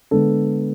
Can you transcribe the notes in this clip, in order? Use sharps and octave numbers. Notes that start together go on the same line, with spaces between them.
D3 G#3 B3 A4